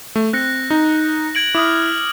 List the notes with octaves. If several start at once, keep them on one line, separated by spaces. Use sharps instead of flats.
A3
C4 F#6 A#6 C#7
D#4
G#6 D7 F#7
E4 D6 D#6 F6